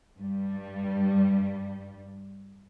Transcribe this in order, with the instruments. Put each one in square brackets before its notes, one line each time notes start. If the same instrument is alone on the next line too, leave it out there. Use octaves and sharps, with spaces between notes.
[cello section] G2 G3